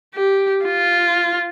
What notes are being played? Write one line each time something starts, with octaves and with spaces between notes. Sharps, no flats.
G4
F4